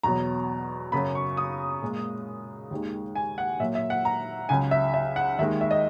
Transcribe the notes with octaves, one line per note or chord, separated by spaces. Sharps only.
E2 B2 F#3 A#5
F#2 C#3 F#3 B5
C#6
D#6
A#2 G#3
D#2 D#3 G#3
G#5
F#5
A#2 F#3 E5
E5
F#5
A#5
C#2 C#3 F#3 G#5
E5
E5
F#5
D#2 D#3 G#3 E5
E5
D#5